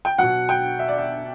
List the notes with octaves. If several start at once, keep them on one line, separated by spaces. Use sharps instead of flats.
G5
B2 F#3 F#5
G5
E5
D5
E5